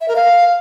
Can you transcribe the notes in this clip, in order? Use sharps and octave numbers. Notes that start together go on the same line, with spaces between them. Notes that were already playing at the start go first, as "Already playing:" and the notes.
E5
A#4
F5